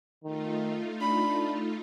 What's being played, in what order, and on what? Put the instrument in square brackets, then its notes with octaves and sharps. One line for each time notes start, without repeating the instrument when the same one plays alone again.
[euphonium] D#3 [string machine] A3 D#4 F4
[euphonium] D4 [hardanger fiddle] B5